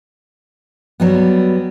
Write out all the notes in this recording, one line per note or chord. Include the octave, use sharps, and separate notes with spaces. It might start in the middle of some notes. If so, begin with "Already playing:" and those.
F#3 G3 B3